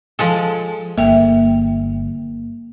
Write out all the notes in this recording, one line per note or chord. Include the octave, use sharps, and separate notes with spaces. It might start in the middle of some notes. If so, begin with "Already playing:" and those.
F3 G#3 A4
G1 A#3 E5 G5